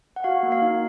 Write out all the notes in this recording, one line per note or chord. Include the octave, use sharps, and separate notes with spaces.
F#5
F#4 F5
A#3
F5
D#4